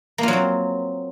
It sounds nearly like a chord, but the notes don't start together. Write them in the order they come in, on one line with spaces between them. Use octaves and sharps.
A#3 F4 F#3 C4